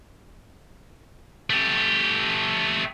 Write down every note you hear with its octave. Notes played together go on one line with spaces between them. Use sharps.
A3 G4